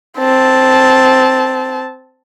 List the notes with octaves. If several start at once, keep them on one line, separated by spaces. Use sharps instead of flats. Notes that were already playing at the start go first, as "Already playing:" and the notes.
C4 A5